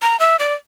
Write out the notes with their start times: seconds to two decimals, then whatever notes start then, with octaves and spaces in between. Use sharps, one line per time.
0.02 A#5
0.20 E5
0.39 D5